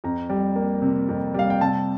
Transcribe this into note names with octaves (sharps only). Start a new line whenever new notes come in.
F2 A#5
G3
A#3
C3
F2
G3 F5
G5
C3 A5